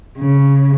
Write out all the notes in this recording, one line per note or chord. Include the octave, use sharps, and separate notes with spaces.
C#3